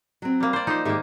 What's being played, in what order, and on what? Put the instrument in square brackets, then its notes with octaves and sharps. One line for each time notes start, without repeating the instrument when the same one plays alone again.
[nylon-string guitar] F#3 C4
[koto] G3 A#3
C5 D5
[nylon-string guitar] F3 [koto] D#4 C5
[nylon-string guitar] G#2 G4 E5 [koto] D#3 A#3